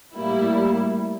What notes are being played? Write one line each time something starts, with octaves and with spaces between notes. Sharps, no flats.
A2 G3 A#3 E4